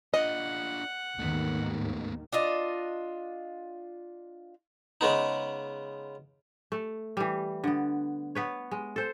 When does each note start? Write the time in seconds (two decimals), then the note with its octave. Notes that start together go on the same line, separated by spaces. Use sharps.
0.14 D4 F4 D#5 F#5
1.19 D#2 G#2 D#3 A3 B3
2.32 D4 F4 D#5
5.01 C#3 G#3 B3 D#4
6.72 A3
7.17 E3 G3
7.64 D3 B3
8.35 B3 B4 C#5
8.71 G#3
8.96 A4 C5